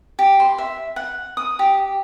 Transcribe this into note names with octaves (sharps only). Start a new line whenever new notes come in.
G4
C6
E5
F#5
D#6
G4